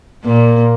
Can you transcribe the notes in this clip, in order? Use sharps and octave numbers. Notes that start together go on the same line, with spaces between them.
A#2 A#3